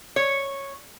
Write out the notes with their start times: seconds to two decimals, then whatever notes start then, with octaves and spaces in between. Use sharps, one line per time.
0.16 C#5